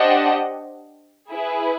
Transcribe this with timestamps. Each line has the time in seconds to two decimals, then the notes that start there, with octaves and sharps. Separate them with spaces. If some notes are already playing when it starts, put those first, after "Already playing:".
Already playing: D4 G4 C5 D#5 F#5
1.30 E4 G#4 B4